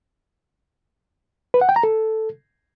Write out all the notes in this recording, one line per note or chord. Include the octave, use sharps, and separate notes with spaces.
B4
F#5
G5
A#5
A4